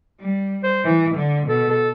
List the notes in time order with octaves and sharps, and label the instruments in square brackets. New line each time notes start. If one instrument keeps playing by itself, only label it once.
[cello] G3
[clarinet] C5
[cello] E3
D3
[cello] B2 [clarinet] A4
[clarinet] A4